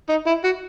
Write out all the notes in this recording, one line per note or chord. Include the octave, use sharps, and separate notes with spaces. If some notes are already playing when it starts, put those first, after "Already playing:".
D#4
E4
F#4